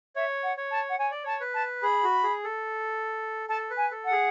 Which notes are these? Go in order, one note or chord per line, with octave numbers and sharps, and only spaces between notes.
C#5 E5
F#5
C#5
A5
F#5
C#5 G#5
D5
C#5 A5
B4
A5
G#4 B5
F#4
G#4
A4
A4 A5
B4
G#5
A4
F#5
G#4